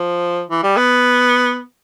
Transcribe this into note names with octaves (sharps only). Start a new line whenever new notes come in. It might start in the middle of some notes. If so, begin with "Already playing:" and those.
Already playing: F3
E3
G3
B3